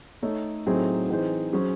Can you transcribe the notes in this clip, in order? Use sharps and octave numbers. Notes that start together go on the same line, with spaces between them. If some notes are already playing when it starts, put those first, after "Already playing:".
A3 D#4 A4 C#5
A2 F#3 C4 D#4 G#4
E3 C4 D#4 G#4 C5
F#3 C#4 G#4 C5